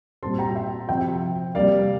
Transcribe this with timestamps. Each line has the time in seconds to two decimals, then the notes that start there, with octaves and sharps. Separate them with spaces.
0.23 A#2 G3 C4 A5 C6
0.39 G5 A#5
0.55 E5 G5
0.89 C3 F3 C4 E5 G5
1.55 C3 G3 A#3 D5 F5